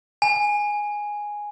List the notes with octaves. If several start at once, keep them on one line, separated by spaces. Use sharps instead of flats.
G#5